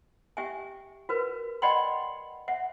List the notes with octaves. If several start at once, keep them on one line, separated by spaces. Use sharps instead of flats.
G4 E5 G5 G#5
F#4 A#4 B4
D5 D#5 F#5 G5 B5 C6
E5 F#5